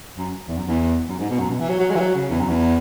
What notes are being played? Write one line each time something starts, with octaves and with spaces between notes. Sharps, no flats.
F#2
E2
F#2
E2
F#2
G#2
B2
F#2
B2
E3
F#3
F#3
G#3
E3
F#3
C#3
E2
F#2
E2